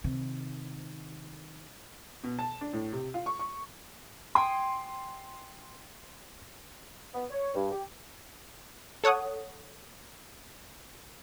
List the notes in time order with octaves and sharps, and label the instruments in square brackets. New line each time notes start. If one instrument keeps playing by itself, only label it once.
[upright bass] C3 D#3
[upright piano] B2
A5
D4
A2
C3
F4
C#6
C#6
[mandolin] G5 G#5 D#6 [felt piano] C6
[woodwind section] B3
C#5
G2
G4
[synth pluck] A4 C#5 F#5 D#6